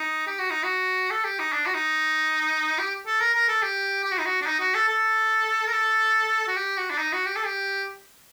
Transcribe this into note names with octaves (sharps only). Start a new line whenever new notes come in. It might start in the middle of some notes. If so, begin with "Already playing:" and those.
Already playing: D#4
G4
F#4
D#4
F#4
A4
G4
D#4
D4
F#4
D#4
G4
A4
A#4
A#4
A4
G4
G4
F#4
D#4
F#4
D4
D#4
F#4
A4
A4
A#4
A4
F#4
G4
F#4
D4
D#4
F#4
G4
A4
G4